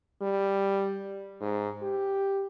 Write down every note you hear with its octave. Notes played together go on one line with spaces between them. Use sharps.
G3
G#2
G4